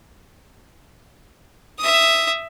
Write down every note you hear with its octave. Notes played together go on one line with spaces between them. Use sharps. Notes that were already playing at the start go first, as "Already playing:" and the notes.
E5 D#6